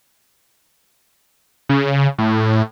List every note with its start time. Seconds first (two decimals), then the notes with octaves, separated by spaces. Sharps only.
1.69 C#3
2.19 A2